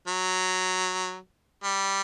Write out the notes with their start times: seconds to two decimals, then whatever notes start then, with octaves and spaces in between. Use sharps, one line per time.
0.07 F#3
1.64 G3